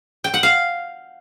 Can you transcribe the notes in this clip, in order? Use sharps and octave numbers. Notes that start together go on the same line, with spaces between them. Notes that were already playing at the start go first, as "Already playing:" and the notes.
G5
F#5
F5